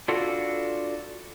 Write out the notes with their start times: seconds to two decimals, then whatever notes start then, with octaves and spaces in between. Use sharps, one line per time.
0.08 D4 F4 F#4 A4 B4